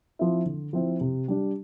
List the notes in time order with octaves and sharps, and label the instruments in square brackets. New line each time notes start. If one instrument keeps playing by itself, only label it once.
[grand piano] F3 C4 E4
D3
F3 C4 E4
C3
G3 D4